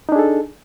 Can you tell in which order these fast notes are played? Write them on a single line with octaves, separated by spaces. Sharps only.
D#4 D4 G#4 A4